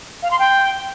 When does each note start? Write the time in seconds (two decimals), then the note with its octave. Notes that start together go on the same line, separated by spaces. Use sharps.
0.23 F5
0.31 C6
0.39 G5